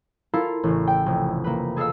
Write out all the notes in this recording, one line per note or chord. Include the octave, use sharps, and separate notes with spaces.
E4 F4 A4 A#4 F5
A1 C#3
G5
F1
A#3 B4
G#4 A4 D#5 F5 E6